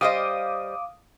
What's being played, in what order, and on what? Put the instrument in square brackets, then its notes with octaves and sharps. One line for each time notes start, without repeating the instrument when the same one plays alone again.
[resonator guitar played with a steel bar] G3 C5 D#5 [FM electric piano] F5 D6 D#6